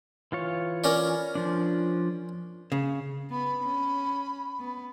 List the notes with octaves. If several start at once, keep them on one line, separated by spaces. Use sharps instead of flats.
E3 F4 C#5
C#4 A#4 D5
F3 D4
C#3
B3 B5
C#4
B3